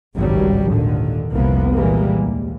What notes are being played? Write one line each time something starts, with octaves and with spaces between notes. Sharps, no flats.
G#1 C#2 G2 F#3 G3
D#2 A#2 D3 D#3
F1 C2 F3 A#3 B3
A#2 E3 G3 G#3 A#3
D#2